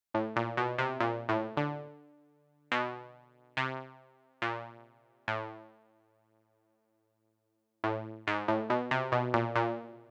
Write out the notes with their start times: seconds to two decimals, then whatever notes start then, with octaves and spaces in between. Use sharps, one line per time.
0.14 A2
0.36 A#2
0.57 B2
0.78 C3
1.00 A#2
1.29 A2
1.57 D3
2.72 B2
3.57 C3
4.42 A#2
5.28 A2
7.84 A2
8.27 G#2
8.48 A2
8.70 B2
8.91 C3
9.12 B2
9.34 A#2
9.56 A#2